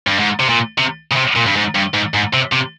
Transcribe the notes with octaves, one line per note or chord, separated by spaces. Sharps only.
G2
G#2
C3
A#2
C3
C#3
C3
A#2
G2
G#2
G2
G#2
G#2
C3
C3